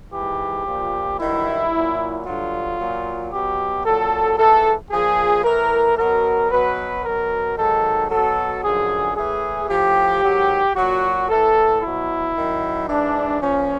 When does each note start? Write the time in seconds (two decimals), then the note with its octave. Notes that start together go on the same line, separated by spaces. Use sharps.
0.13 G#2 E3 G4
0.66 A#2 F3
1.19 G2 D#3 F#3 E4
1.72 A#2 F#3
2.25 G2 D3 F#3 F4
2.79 A#2 F#3
3.31 B2 F#3 G4
3.85 A#2 F#3 A4
4.38 G#2 E3 A4
4.91 A#2 F3 G#4
5.44 A2 E3 A#4
5.97 B2 F#3 A#4
6.51 B2 F#3 B4
7.04 B2 F#3 A#4
7.57 G#2 D#3 F#3 A4
8.10 B2 F#3 A4
8.63 F#2 D3 F3 G#4
9.16 A2 E3 G#4
9.69 A2 F3 G4
10.23 G#2 D#3 F#3
10.76 A#2 F#3 F#4
11.29 A2 E3 A4
11.82 B2 F#3 E4
12.35 F#2 D#3 F#3
12.88 G#2 E3 D4
13.41 A#2 F3 C#4